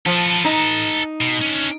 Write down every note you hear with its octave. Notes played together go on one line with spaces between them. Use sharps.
F3 A4 B4
D#4
B2
C#4 D4